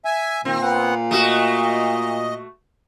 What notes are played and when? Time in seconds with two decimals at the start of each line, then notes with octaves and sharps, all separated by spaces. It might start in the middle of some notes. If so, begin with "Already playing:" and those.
0.05 E5 G#5
0.45 A#2 D#3 C4
0.62 B3 F#5
1.11 A3 F#4 D#5